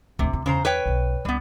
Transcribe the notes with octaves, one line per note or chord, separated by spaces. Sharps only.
D2 C3 A#3
E4
E2 C#3 C5 A#5
B4 C#5 G5
B1 F#2
C#2 G3 B3